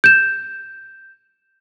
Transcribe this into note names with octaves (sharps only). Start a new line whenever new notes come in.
G6 E7